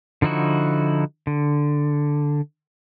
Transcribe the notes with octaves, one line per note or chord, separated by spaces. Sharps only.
D3 F3 D#4 E4 F#4
D3